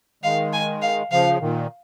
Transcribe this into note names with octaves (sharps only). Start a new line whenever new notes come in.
D#3 G#3 F5
G#5
F5
C#3 F3 F5
A#2 D#3